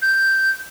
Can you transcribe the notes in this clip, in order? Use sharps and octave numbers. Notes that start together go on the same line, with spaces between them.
G6